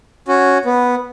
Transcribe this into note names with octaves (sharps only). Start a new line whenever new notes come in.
C#4 F#4
B3